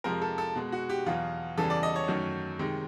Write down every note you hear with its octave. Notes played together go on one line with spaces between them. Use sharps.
F2 C3 F3 G#3 A#4
A4
A4
B2 G#3
F#4
G4
E2 B2 F#3 F4
E2 C#3 E3 G3 A4
D5
D#5
C#5
F#2 D#3 F#3 A3
C3 D#3 G#3